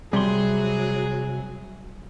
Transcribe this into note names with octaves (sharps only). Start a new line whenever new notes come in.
C3 F#3 G3 G#4 C6